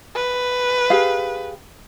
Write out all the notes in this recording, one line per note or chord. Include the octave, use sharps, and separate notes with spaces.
B4
G4 G#4 F5